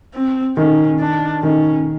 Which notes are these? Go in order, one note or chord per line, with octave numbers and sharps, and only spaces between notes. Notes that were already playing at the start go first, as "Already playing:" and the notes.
C4
D#3 C#4
D4
D#3 C#4